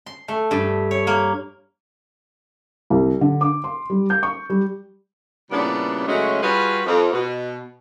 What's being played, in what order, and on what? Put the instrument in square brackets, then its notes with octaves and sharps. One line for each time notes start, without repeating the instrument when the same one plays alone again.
[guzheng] C6
A3
G2
C#5
A#3
[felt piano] C2
D3
D6
C6
G3
G6
C#6
G3
[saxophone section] A#2 C#3 E3 G3 B3 D4
C#3 F#3 G#3 A3 C#4
G3 F4 F#4 G#4 B4
F2
B2